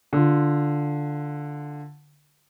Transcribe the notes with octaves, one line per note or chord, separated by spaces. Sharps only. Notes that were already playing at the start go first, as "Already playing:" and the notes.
D3 F4